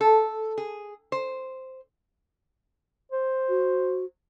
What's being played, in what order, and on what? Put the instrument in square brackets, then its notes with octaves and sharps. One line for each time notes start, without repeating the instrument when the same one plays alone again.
[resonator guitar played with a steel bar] A4
G#4
C5
[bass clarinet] C5
[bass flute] F#4